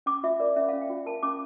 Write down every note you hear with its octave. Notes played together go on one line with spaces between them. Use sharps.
C#4 D6
F4 E5
A#4 D5
C#4 E5
F5
C#4
G5
F4
A#4 A5
C#4 D6